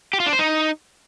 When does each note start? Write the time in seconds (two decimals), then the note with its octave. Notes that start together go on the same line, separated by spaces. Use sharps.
0.13 G4
0.20 F4
0.26 D4
0.33 C5
0.39 D#4